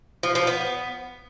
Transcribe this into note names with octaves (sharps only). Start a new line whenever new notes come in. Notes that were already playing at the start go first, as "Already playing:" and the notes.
F3
F3
B3